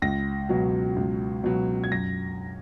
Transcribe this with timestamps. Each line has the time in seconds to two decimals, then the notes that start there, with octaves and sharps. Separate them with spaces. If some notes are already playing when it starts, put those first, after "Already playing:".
0.02 C#2 A#6
0.49 B2 F#3
0.96 C#2
1.44 B2 F#3
1.84 G#6
1.91 F#2 A#6